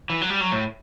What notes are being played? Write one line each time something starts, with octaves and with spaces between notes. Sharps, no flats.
E3
F#3
G3
F#3
A2